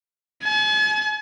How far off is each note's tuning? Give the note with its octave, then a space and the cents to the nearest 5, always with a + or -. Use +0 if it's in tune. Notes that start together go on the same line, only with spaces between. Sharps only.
G#5 +45